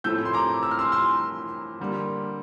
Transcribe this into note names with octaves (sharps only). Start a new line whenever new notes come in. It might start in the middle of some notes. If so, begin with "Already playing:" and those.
A2 F3 A3 C4 E4 E6 G6
C6
A#5 D6
E6
F6
C6 E6
C6 E6
D3 G3 A#3